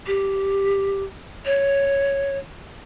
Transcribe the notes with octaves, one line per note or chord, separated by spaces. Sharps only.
G4
C#5